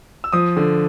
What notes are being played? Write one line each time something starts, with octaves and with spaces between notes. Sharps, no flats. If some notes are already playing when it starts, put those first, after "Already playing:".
E6
F3 D#6
D3